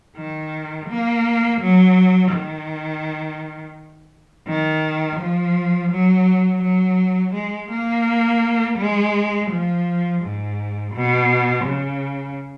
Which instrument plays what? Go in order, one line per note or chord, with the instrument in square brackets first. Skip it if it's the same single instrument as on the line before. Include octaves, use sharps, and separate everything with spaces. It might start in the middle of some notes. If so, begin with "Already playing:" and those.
[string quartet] D#3
A#3
F#3
D#3
D#3
F3
F#3
F#3
G#3
A#3
G#3
F3
G#2
B2
C#3